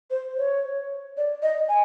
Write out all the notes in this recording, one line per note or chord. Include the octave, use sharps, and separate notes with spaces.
C5
C#5
D5
D#5
G#5